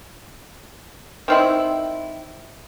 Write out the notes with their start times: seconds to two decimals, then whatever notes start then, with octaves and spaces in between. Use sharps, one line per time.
1.28 D#3 C4 E4